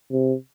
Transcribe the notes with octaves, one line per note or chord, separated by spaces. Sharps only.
C3